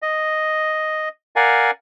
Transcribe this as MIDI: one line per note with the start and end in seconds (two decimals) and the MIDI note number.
0.02 1.09 75
1.36 1.71 70
1.36 1.71 74
1.36 1.71 77
1.36 1.71 78
1.36 1.71 80